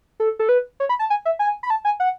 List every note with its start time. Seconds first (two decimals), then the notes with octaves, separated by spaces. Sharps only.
0.20 A4
0.39 A4
0.49 B4
0.80 C#5
0.89 B5
0.99 A5
1.10 G#5
1.25 E5
1.39 G#5
1.63 B5
1.70 A5
1.85 G#5
2.00 F#5